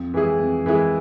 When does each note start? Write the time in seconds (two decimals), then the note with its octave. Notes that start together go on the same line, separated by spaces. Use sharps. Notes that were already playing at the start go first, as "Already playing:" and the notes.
Already playing: F2
0.14 E3 G#3 E4 G#4
0.39 F2
0.66 E3 G#3 E4 G#4